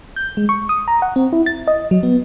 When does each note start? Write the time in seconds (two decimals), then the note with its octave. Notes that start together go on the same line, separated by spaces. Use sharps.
0.16 G6
0.37 G#3
0.49 C#6
0.69 D#6
0.88 A#5
1.02 F#5
1.16 C4
1.33 E4
1.46 A6
1.68 D#5
1.91 F#3
2.03 B3